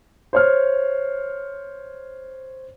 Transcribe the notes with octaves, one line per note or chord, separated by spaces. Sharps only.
C5 C#5 F6